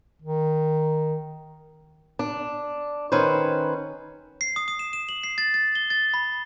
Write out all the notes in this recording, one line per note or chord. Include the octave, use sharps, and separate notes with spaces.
D#3
D4
D#3 C#4 B4 C5
C7
D#6
D#6
E7
E7
F#7
C7
A6
A6
G7
A6
B5